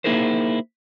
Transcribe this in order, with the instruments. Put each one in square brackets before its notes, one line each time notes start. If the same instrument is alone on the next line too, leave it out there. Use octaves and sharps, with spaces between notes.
[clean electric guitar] A#3 D#4 E4 G#4 A#4 C5